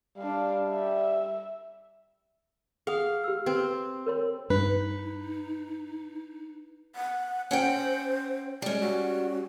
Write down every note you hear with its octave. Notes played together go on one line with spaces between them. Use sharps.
G3 D4 F5
E5
G#4 F5 F#5 D#6
G4 E6
C4 B4
A#4 C#5 C6
G2 D#4 B4
F#5
C#4 C5 F#5 G5
G3 G#3 C#4
F#4